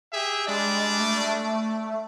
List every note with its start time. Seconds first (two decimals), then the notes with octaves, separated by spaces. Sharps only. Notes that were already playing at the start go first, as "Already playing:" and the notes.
0.13 G4 G#4 E5
0.48 G3 G#3 D4 D5
1.00 A3